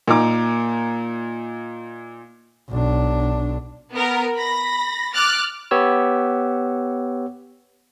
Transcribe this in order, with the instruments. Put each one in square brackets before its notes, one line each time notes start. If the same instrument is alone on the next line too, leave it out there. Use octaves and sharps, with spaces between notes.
[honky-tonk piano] A#2 D#4 A#5 D6
[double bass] B1 D4
[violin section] B3 A#4
B5 A#6
D6 F6 F#6 A6
[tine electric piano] B3 G4 C#5 E6